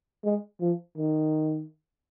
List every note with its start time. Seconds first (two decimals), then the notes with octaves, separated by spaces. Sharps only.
0.24 G#3
0.60 F3
0.97 D#3